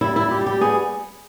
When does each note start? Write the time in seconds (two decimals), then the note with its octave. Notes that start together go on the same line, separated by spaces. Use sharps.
0.01 G3 E4
0.16 E4
0.21 G3
0.31 G4
0.41 G3
0.46 G4
0.61 B3 G#4